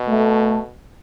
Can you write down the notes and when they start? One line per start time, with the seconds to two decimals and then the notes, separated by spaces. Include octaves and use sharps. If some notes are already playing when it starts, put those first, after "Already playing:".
Already playing: B2
0.08 A3